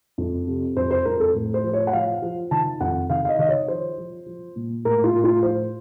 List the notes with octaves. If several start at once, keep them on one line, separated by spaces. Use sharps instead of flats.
F2
C3
F2 C5
C5
F2 A#4
A4
A2
C5
F3
C#5
F#5
F3 F5
F3
D#3 A5
F2 F#5
D#3 F5
F5
D#5
D#3 D#5
C#5
F3 C5
F3
F3
A#2
A2 A#4
F4
A2
F4
F3 C5